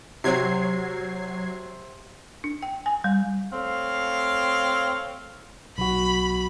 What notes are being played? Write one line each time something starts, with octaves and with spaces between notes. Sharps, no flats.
C3 F#3 G#6 C7
D4
G5
G#5
G3
A3 C4 C#5 F5
B1 F#4 B5